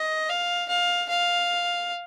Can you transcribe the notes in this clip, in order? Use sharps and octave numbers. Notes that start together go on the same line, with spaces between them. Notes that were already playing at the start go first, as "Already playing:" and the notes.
Already playing: D#5
F5
F5
F5